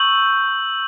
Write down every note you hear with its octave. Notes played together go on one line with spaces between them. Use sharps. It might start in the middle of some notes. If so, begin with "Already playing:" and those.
Already playing: C#6 E6 G6 F#7